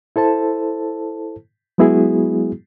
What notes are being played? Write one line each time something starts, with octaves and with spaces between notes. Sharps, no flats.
E4 A4 C5 A5
F#3 G#3 B3 E4 F#4 G#4